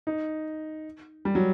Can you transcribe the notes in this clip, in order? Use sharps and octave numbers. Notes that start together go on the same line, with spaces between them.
D#4
G3
F#3